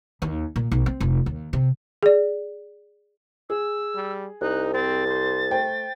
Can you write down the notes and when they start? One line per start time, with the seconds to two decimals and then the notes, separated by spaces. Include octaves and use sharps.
0.22 D#2
0.56 A#2
0.71 B1
0.86 C4
1.00 F1
1.26 D#2
1.53 C3
2.03 G#4 D5
3.50 G#4 E6
3.95 G3
4.41 C2 D#4 F#6
4.74 C4 A6
5.07 C5
5.51 A3 C5 G5